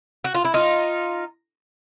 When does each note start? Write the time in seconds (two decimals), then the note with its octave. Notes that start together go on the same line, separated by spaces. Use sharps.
0.24 F#4
0.35 F4
0.45 E4
0.54 D#4 F4